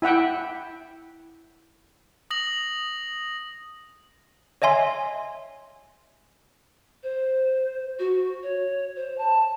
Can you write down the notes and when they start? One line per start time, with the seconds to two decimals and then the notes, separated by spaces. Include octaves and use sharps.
0.02 E4 E5 F#5 G5
2.31 D#6 A#6 F#7
4.62 C#5 D#5 E5 G#5 C6
7.03 C5
7.99 F#4
8.43 C#5
8.96 C5
9.18 A5